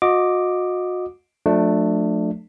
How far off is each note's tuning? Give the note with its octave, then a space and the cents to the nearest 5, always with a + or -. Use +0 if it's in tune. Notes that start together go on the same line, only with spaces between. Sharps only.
F#4 -35 D#5 +0 D6 +5
F3 +45 A3 +0 D4 +20